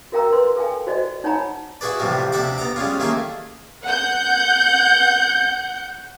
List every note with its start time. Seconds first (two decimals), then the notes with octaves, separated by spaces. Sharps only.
0.12 F#4 A#4 F5 G5 A#5 E6
0.33 B4 C6
0.56 A4 F5 G5 G#5
0.87 F#4 C5 D5 D#5
1.24 D#4 C#5 F#5 G#5 A#5 B5
1.81 E4 F#4 G#4 B4 D5
1.99 A2 C3 E3 F3 G3
2.32 D2 C3 D5 E5 F#5 D6
2.58 B3 A#5 D6
2.76 G3 G#3 C#4 F4
2.99 D#3 A3 A#3 E4 G#4
3.84 F#5 G6